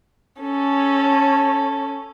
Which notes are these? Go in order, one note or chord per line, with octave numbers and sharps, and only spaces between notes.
C#4 A4